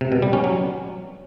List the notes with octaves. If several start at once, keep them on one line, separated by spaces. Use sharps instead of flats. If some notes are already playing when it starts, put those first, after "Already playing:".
C3
B2
G3
C#4
F#3